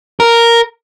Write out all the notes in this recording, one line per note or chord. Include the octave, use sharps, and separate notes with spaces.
A#4